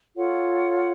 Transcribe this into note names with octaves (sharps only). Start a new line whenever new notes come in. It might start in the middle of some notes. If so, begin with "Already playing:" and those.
F4 A4 C#5 F#5